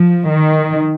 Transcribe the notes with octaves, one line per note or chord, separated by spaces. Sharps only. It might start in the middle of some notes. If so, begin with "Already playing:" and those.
Already playing: F3
D#3